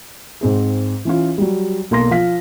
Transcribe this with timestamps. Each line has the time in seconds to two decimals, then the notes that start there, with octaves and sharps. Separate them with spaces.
0.41 G#2 C4 G#4
1.05 E3 C#4 F4
1.38 F#3 G3
1.91 B1 A#3 C6 A#6
2.11 F3 F5 B6